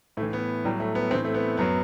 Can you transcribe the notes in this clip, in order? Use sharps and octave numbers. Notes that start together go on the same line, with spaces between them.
A2 A3
E3
B3
A2 F#3 G3
A3
B3
A2 E3 C4
A3
B3
F#2 F#3 B3